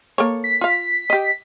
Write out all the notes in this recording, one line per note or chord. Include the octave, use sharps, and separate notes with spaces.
A#3 A4 C#5
B6
F4 F5
G4 D#5